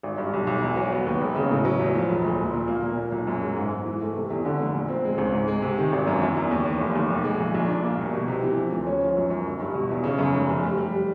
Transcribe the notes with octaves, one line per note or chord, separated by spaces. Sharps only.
G#1
G2
B1
B1
E2
F#3
B3
D#2
E1
C#3
A2
F#3
E2
F3
E1
D2
A#2
A#2
A#3
A#2
A#2
B1
F#2
G#3
G#2
G#2
E3
A3
C3
E2
D3
F1
A#2
C4
G#3
C#2
G#2
G#3
C3
D#3
G#1
F#2
E2
E2
D#2
D#2
F1
D#2
B1
G#3
A#1
A#1
D4
A#3
C2
B2
C3
E3
F3
D2
C#4
F3
F#2
F#2
G1
G2
B2
E2
C#3
F#2
F1
F1
G3
G3